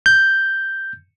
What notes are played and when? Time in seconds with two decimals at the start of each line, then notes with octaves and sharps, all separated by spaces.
0.06 G6